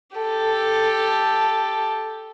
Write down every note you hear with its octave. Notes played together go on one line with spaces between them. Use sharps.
G4 A4